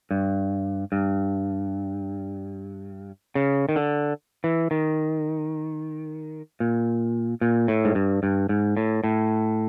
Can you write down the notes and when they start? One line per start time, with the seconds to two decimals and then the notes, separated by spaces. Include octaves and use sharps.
0.11 G2
0.92 G2
3.35 C#3
3.69 D#3
3.76 D3
4.44 E3
4.71 D#3
6.60 A#2
7.41 A#2
7.68 A2
7.85 G#2
7.95 G2
8.23 G2
8.49 G#2
8.77 A2
9.04 A2